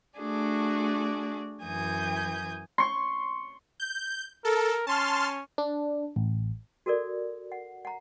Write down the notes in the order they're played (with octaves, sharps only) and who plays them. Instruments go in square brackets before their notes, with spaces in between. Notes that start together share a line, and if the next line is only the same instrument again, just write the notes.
[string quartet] A3 D4 F#4 G#4 D5
F#2 E3 G#5 D#6 G6
[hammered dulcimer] C6 C#6
[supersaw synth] G6
[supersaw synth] A4 [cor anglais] A#4
[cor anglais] C#4 [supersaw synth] A5 C6 F6
[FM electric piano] D4
A1
[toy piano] F#4 A4 A#4 D5
F#5
F#5 A#5